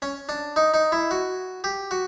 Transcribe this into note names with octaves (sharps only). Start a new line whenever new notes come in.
C#4
D4
D#4
D#4
E4
F#4
G4
F#4